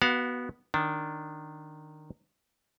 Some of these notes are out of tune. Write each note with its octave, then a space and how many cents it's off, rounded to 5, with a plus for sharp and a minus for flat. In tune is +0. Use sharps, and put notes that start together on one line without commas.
B3 -10 F#4 +20 F5 +30
D#3 -15 D4 -15